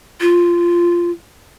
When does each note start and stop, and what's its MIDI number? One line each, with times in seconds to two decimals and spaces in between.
0.21 1.11 65